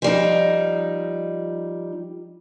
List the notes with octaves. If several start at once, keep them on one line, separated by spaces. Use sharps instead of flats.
F3 G3 D#4